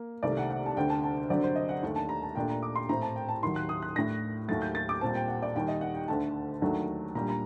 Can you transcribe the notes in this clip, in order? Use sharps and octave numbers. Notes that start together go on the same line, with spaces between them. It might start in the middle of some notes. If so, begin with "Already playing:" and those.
Already playing: A#3
C2 C3 D#3 A3 D5
F#5
F#5
A5
D2 D3 A3 D4 G5
A5
A5
G2 D3 F#3 C4 D5
C5
D#5
F#5
D#2 D#3 A3 D4
A5
A#5
A5
A#2 A3 D4 G5
A#5
D6
C6
A2 A3 C4 A#5
A5
G5
A5
D#2 D#3 F#3 C6
F#6
D#6
F#6
A2 A3 D4 A#6
D#2 D#3 F#3 A3 A6
G6
A6
D6
A#2 G3 C4 A5
G5
F#5
D5
D#2 D#3 G3 G5
D#5
F#5
G5
D2 D3 A3 D4 A5
D#2 D#3 F#3 A3 D4
A#2 G3 D4 A#5
A#5